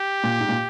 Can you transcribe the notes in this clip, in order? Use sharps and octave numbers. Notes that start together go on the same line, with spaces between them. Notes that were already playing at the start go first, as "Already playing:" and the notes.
Already playing: G4
A#2
G#2
A#2